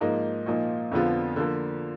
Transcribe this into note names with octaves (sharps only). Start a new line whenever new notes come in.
G#2 F3 A#3 D#4
A#2 F3 A#3 D#4
F2 D3 F3 B3 F4
D3 F3 A#3